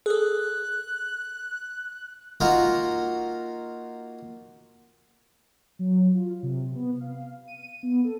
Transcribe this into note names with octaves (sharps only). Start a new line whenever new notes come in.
G#4 A4 F#6
A#3 D#4 F4 F#4 A#4
F#3
F4
C3
B3
F5
D#7
B3
A4